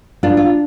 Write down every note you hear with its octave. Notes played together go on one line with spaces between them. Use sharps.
D4 F4
F4